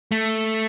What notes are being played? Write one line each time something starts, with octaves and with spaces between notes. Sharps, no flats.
A3